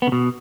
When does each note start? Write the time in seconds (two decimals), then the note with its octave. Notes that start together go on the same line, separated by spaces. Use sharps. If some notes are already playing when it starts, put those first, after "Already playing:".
0.02 B3
0.07 C#3
0.12 B2